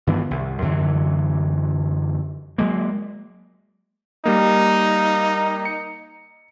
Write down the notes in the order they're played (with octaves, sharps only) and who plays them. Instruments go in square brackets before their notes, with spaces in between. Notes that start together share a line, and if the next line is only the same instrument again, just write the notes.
[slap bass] G2 D#3 E3 B3
C2
F#2 D3 E3 F#3
F#3 G#3 A#3
[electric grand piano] G3 A#3 [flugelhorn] D#4
[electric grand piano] C#7